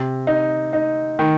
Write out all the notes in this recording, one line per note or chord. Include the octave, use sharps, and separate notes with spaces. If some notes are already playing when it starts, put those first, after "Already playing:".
Already playing: C3
D#4
D#4
D#3